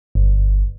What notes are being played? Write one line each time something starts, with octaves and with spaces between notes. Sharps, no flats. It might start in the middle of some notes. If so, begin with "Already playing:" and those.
G1